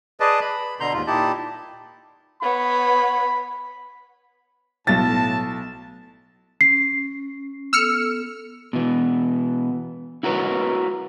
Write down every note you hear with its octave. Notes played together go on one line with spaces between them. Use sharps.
G#4 B4 D5 D#5 A5
B5
B2 D3 A#5 C6 G6
D#2 G#2 F4
A#2 D#4 E4 G4 A5
B3 C#5 B5
B1 A2 A5 A6
C#4 C7
B3 A4 E6 F6 C#7
B2 E3
E4 F#4 A#4 B4 C#5